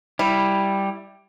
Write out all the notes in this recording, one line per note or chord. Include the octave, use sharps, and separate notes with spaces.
G3 E4